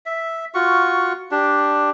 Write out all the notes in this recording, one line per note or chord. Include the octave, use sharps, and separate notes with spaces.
E5
F4 F#4 C#6
D4 G4